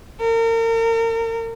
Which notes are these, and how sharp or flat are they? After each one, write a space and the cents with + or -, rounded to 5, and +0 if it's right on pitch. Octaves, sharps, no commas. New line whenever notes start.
A#4 -35